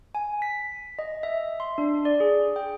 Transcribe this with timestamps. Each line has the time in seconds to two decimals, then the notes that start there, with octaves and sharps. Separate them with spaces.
0.15 G#5
0.42 B6
0.99 D#5
1.23 E5
1.60 C6
1.78 D4
2.05 D5
2.20 G#4
2.56 G5